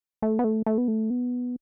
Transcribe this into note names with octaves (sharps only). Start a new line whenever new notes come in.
A3
B3
A3
A3
B3
A3
B3